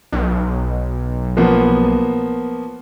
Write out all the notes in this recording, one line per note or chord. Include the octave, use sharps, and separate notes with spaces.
B1
F3 A#3 B3